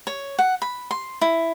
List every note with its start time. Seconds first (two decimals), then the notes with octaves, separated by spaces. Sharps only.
0.07 C#5
0.39 F#5
0.62 B5
0.91 C6
1.21 E4